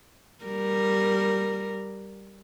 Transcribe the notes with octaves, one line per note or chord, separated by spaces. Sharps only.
G3 A#4